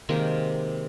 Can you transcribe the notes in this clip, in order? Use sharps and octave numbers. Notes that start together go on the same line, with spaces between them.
C3 D#3 G#3 A#3